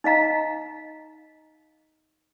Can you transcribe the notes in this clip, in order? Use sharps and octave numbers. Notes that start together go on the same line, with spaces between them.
D#4 D#5 F5 A#5